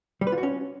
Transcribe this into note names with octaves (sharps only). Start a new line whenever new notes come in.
G3
B4
F4
F#4
C#4